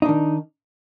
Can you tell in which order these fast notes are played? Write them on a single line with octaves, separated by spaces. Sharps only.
D#4 D4 D#3